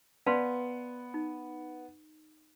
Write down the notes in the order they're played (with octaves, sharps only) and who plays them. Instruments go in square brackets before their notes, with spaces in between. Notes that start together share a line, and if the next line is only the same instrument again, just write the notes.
[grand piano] B3 [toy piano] B4 D5 F5 A5 C6
[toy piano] D#4